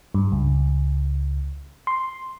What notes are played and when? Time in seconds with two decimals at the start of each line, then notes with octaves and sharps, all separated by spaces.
0.14 G2
0.32 C#2
1.87 C6